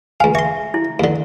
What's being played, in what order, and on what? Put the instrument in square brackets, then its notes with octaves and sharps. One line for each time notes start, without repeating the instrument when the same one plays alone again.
[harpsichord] C#2 F5 [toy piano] G#5
[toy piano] E5 [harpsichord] C6 C#6
[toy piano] E4
[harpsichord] D#2 D3